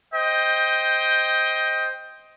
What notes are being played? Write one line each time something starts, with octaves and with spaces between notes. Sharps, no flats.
C5 D#5 G5